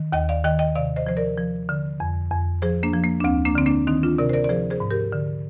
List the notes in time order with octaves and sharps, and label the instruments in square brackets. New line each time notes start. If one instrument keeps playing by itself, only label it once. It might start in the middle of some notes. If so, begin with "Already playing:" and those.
Already playing: [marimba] D#3
D#2 D#5 G5
D5 F5
D#3 D#5 G5
D#5 G5
C3 D5 F5
C5 D#5
F3 C5
A#4 D5
F3
D3
F2
F2
F3 G#4 C5
A#3 D4
F3
A#3
D4
D2 C4
A#3 D4
D3 C4
A#3 D4
D#3 C4 D#4
D4 F4
C3 A#4 D5
C5
A#4 D5
D5
F3 G#4 C5
G#4 C5
G#2
G4 A#4
D3